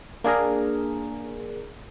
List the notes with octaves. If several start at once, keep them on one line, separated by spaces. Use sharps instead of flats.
A#3 D4 G#4 A#4